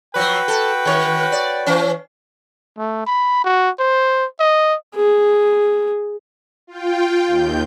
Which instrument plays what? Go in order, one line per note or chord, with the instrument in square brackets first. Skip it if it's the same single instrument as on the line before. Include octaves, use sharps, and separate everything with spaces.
[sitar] F3 F#3 [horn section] F#4 B4 G5
[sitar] A4
D#3 C#5
D5
E3 C#4
[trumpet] A3
B5
F#4
C5
D#5
[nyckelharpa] G#4
[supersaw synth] F4 G5
D#2 G6